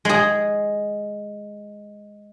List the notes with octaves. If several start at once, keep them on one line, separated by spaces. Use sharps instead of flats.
G#3 G#4